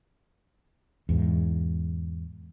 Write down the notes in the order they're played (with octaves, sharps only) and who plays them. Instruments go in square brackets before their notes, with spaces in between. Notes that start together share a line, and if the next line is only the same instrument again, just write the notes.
[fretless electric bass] E2 G#2